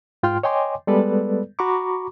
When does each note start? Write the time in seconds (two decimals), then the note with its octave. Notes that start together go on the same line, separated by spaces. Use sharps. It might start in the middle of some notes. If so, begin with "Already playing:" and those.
0.23 G#2 F4 G5 C6 F6
0.43 C#5 D#5 G5 G#5 C6 D6
0.87 G3 G#3 B3 A4 B4 D5
1.59 F#4 A#5 B5 C#6 D6